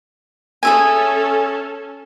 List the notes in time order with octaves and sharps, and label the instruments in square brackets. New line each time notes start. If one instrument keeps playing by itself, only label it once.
[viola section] C#4 A4 [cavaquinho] G#4 E5 G#5